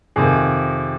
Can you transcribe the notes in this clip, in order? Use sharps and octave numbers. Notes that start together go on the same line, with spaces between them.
F2 C3 D#3 G#4